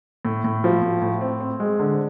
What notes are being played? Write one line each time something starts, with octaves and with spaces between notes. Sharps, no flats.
A2
A2
F3
A2
A2
C4
C4
G#3
D3